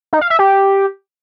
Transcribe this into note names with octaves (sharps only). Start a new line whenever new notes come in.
D#4
F5
E5
G4